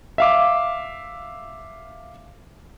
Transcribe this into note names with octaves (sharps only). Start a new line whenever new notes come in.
E5 F5 D6